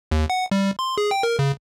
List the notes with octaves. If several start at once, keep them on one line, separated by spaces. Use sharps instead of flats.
D#2
F#5
G3
C6
G#4
G5
A#4
C#3